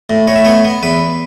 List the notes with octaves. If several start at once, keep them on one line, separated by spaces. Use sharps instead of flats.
A2
A2 C#5
E5
B3 C#5
B3
E2 B4